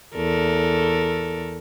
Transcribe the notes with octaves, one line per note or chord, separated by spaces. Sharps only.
E2 A4 A#4